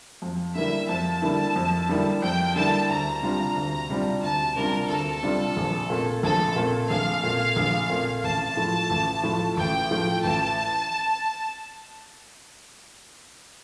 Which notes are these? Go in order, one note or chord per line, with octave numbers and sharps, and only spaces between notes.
F2
D3 G3 A#3 E4 E5
F2 A5
D3 G3 A#3 E4
F2
D3 G3 A#3 E4
F2 G5
D3 G3 A#3 E4 A5
D2 A#5
C3 G3 D4 F4
D2
C3 G3 D4 F4
D2 A5
C3 G3 D4 F4 A#4
D2 A4
C3 G3 D4 F4
A#1
A#2 A3 C4
A#1 A4
A#2 A3 C4
A#1 F5
A#2 A3 C4
A#1
A#2 A3 C4
A1 A5
A2 F3 A3
A1
A2 F3 A3
A1 G5
A2 F3 A3
A1 A5